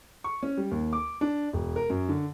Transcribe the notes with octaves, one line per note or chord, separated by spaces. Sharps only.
C#6
C#4
G3
D#2
D6
D4
E1
A#4
F#2
D3